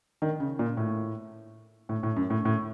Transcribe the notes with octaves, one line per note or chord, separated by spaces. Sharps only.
D#3
C#3
A#2
A2
A2
A2
F#2
A2
A2